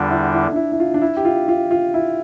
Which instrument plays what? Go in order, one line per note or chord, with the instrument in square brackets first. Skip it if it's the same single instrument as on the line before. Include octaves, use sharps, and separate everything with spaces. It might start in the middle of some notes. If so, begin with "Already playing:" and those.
Already playing: [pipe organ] E2 D3 G3 D4 [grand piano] F4
[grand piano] E4
E4
D4
E4
E4
F4
D4
E4
G4
F4
F4
F4
E4